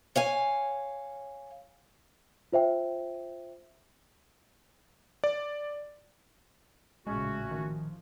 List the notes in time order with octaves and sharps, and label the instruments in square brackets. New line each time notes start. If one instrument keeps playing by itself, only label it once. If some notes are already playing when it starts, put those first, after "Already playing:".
[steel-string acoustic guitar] C#5 F5 G#5
[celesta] F4 C5 E5 G5
[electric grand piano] D5
[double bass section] A1 A#2 C#3 [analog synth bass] G#3 [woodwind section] A3 C#4 F#4
[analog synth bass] D#3 [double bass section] F3